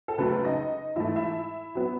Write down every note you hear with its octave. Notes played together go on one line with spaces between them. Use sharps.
A4
C#2 C#3 F#3 A3 B4
B4
D#4 D#5
G#2 E3 A3 E4 E5
E4 E5
F#3 B3